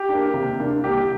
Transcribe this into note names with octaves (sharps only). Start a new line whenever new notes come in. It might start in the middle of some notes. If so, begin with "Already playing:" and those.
Already playing: G4
A#3 D4
C3
A#3 D4
C2 G4